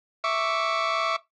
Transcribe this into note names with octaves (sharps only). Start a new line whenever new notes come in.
E5 C#6 D6